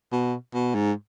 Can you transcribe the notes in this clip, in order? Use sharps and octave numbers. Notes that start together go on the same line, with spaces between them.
B2
B2
G#2